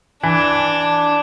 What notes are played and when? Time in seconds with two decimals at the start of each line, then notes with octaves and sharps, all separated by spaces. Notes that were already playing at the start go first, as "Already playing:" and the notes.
0.23 E3 D4